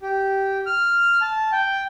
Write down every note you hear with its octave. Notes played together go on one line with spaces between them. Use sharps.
G4
F6
A5
G5